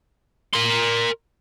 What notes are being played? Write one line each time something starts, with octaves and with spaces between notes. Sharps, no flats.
A#4 C6